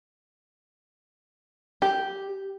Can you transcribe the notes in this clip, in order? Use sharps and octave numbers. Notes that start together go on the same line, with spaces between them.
G4